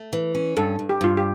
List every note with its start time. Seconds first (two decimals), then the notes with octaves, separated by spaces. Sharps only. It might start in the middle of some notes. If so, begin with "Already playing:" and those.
Already playing: A3
0.13 E3
0.35 C#4
0.57 G2 A4
0.79 G2
0.89 G4
1.01 G2 F4
1.17 G4